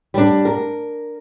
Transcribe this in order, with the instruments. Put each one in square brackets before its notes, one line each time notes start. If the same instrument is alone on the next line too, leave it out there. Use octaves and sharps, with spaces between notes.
[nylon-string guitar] G3 D4
A#4